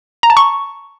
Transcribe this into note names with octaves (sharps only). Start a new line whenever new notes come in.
A#5
A5
C#6